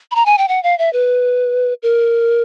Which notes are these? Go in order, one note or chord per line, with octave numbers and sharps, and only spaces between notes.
B5
A#5
G#5
G5
F#5
F5
E5
B4
A#4